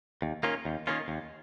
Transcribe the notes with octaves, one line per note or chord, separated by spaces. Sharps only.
D#2
D#3 A#3 C#4 F4
D#2
D#3 A#3 C#4 F4
D#2